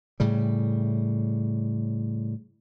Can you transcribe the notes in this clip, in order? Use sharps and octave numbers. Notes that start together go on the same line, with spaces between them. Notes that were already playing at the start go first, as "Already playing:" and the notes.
A2 C#3 G3